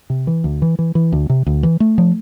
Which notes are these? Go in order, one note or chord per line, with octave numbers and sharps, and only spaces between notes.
C3
E3
D2
E3
E3
E3
D2
C3
D2
E3
A3
F3